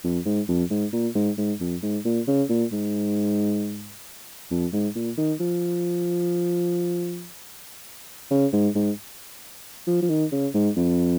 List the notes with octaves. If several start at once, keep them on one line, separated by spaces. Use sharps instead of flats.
F2
G#2
F2
G#2
A#2
G#2
G#2
F2
G#2
A#2
C#3
A#2
G#2
F2
G#2
A#2
D#3
F3
C#3
G#2
G#2
F3
F3
D#3
C#3
G#2
F2